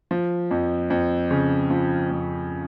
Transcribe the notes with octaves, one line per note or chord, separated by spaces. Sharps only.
F3
F2
F2
C#3
F3
F2